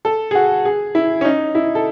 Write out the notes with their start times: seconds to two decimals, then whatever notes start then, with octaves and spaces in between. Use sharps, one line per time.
0.05 A4
0.31 G#4
0.35 F#4
0.65 G#4
0.95 E4
1.21 C#4
1.25 D#4
1.55 E4
1.75 A4